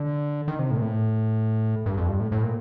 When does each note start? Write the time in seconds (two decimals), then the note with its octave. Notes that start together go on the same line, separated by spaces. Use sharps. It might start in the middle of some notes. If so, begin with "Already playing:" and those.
Already playing: D3
0.48 D#3
0.59 C3
0.71 A2
0.77 A#2
0.82 A2
1.86 G2
1.97 F2
2.08 G2
2.20 A2
2.32 A2
2.43 A#2